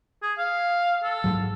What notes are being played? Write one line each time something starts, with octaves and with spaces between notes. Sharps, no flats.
G#4
F5
A4
G#2 F#3